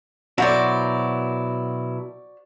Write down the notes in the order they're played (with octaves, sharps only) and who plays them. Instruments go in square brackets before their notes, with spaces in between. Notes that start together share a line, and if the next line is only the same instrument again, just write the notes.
[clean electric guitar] B2 F#3 E4 [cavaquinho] F#4 C5 D5